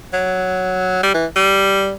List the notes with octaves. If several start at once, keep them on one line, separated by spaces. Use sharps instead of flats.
F#3
G3
E3
G3